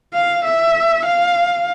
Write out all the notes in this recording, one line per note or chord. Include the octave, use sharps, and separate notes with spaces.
F5
E5
F5